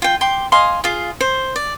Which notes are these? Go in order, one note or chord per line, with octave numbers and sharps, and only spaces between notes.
F4 G5
G5 C6 D6
D#5 F5 G#5 C6
F4 G#4 F5
C5
D5